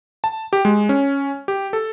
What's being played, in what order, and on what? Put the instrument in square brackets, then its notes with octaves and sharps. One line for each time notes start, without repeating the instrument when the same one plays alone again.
[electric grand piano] A5
G4
G#3
C#4
G4
A4